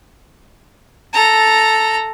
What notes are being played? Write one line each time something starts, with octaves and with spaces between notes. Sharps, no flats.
A4 A#5